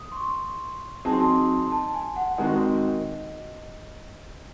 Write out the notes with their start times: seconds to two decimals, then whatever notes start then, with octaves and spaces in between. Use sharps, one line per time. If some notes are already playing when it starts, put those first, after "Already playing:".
Already playing: D#6
0.12 C6
0.17 C#6
1.05 F#3 C4 D#4 G#4 A5
1.13 C6
1.21 A5
1.72 A5
1.94 G#5
2.16 F#5
2.38 D#3 G#3 C4 F#4 D#5